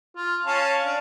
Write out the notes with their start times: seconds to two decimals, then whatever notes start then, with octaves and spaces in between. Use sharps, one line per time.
0.16 F4
0.45 C#4 F5 A5
0.85 D4